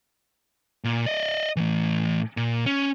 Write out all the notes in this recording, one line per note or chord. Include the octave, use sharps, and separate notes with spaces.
A#2
D5 D#5
A2 E3
A#2
C#4